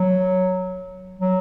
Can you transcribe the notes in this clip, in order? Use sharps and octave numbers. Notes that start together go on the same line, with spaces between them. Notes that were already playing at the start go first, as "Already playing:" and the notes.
Already playing: F#3
F#3